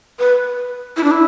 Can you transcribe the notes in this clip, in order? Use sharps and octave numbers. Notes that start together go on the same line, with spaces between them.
B4
E4
D4
E4